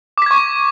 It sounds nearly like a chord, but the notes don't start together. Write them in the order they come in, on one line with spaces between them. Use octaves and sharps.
D6 B6 G#6 C#6